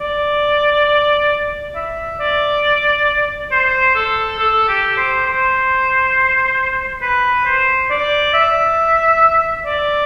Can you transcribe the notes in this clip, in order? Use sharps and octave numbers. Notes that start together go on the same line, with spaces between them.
D5
E5
D5
C5
A4
A4
G4
C5
C5
B4
C5
D5
E5
D5